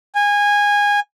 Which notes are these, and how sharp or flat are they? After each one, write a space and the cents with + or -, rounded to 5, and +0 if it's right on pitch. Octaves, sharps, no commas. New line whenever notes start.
G#5 -20